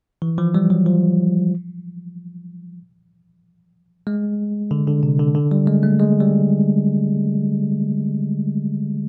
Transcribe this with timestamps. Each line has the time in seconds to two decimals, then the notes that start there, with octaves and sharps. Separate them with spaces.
0.22 E3
0.38 F3
0.55 G3
0.70 F#3
0.86 F3
4.07 G#3
4.71 D3
4.88 D3
5.03 C3
5.19 D3
5.35 D3
5.51 G3
5.67 G#3
5.83 A3
5.99 G#3
6.21 G3